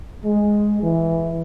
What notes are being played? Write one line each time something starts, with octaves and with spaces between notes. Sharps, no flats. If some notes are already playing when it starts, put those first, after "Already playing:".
G#3
E3